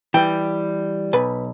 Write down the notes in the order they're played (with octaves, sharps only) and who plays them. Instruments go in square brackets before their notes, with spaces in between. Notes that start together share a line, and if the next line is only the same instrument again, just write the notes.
[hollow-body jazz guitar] E3 G3 [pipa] G5
[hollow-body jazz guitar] B1 [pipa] B4